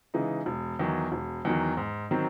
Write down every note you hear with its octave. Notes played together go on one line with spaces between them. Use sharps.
C#3 E3 G#3 D#4
E1
E2 D#3 F#3
E1
E2 D#3 F#3
G#2
D#3 F#3 C4